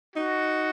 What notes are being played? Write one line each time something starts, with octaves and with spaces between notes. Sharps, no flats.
D#4 F#4